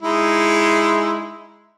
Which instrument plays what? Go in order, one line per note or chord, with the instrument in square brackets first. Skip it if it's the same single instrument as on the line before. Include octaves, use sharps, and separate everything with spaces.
[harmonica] G#3 D#4 E4